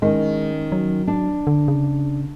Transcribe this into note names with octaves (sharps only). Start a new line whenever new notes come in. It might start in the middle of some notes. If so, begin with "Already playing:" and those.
D#3 G#3 C#4
F#3
D4
D3
C#3